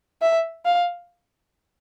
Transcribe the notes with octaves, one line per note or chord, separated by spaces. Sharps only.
E5
F5